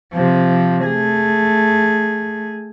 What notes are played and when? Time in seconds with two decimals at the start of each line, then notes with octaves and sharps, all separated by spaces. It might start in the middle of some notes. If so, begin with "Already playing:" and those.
0.13 C3 F3
0.85 A3 G#4